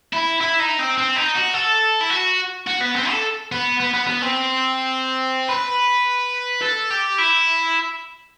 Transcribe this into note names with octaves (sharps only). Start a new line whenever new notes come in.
E4
E4
D#4
C4
C4
D#4
F#4
A4
E4
F#4
F#4
B3
C4
A4
B3
B3
B3
B3
C4
B4
A4
G4
E4